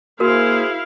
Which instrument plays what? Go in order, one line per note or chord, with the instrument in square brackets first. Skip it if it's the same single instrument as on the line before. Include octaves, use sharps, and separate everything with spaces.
[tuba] A#3 [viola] E4 F5 [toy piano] F#4 A#4 [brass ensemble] G#4 C5